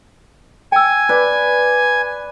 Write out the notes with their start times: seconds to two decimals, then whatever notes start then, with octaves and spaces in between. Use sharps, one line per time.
0.72 G5 G#5 E6
1.09 B4 D5